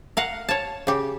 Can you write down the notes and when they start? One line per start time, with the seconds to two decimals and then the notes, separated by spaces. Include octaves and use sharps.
0.17 A#4 F5 F#5
0.49 C#5 A5
0.87 C#3 G4